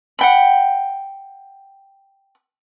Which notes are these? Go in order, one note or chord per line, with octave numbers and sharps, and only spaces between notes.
F#5 G5 B5